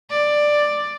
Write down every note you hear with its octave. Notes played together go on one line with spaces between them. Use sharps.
D5